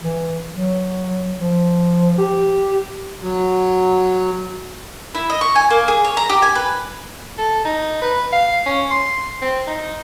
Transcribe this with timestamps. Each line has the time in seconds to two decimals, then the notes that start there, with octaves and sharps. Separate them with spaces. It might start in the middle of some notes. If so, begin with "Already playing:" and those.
0.02 E3
0.52 F#3
1.39 F3
2.18 G4
3.22 F#3
5.15 E4
5.30 D#5
5.41 C#6
5.55 G#5
5.70 A#3
5.88 G#4
6.05 C#5
6.17 A#5
6.29 G4
6.42 G#5
6.55 B4
7.38 A4
7.65 D#4
8.02 B4
8.33 F5
8.66 C#4
8.91 C6
9.42 C4
9.68 D#4